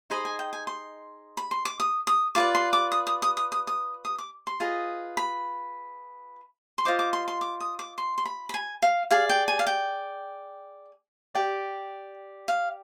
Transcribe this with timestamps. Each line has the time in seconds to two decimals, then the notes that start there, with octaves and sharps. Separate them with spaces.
0.10 D#4 G#4 C5 D#5 B5
0.25 G#5
0.39 G5
0.53 G#5
0.67 C6
1.37 B5
1.51 C6
1.65 D6
1.80 D#6
2.07 D#6
2.35 F4 B4 D5 D6
2.55 C6
2.73 D6
2.92 D#6
3.07 D#6
3.22 D#6
3.37 D#6
3.52 D#6
3.67 D#6
4.05 D#6
4.18 D6
4.47 C6
4.60 F4 G#4 B4 D#5
5.17 B5
6.78 C6
6.85 F4 C5 D#5 D6
6.99 D6
7.13 C6
7.28 C6
7.41 D6
7.60 D#6
7.79 D6
7.98 C6
8.18 C6
8.25 B5
8.49 B5
8.54 G#5
8.82 F5
9.11 G#4 D5 F5
9.29 G5
9.48 G#5
9.59 F5
9.67 G5
11.35 G4 D5 G5
12.48 F5